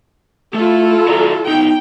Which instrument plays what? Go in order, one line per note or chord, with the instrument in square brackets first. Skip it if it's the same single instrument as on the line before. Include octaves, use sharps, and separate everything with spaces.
[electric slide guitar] A3 [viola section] E4 F4 A4
[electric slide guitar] F#4 D5 A#5
[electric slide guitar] B3 D#4 [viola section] G5